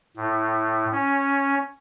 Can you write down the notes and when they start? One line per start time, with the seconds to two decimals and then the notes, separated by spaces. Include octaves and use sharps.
0.16 A2
0.92 C#4